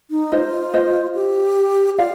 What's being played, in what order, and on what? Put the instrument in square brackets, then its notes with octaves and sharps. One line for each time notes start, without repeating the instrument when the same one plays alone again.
[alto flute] D#4
[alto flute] F4 [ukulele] C5 D#5
[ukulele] C5 D#5
[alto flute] G4
[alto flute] F4 [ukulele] D5 F5